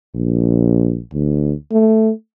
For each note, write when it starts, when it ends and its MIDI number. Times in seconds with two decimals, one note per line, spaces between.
0.15 1.00 34
1.14 1.53 38
1.72 2.11 57